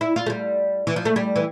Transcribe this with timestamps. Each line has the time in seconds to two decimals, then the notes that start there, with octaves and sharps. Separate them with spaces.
0.01 E4
0.16 F4
0.26 A3
0.30 G3
0.87 E3
0.96 F3
1.05 A3
1.16 G3
1.36 E3